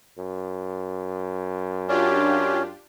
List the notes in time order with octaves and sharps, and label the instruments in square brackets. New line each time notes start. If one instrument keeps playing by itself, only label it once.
[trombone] F#2
[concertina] C#4 [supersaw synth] D4 F4 G4